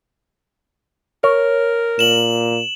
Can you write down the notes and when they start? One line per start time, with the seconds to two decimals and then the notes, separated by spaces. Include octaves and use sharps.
1.24 A#4 C#5
1.99 A#2 E7 F#7